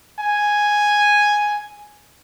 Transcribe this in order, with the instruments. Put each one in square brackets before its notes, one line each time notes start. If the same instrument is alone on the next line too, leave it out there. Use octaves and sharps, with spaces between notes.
[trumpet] G#5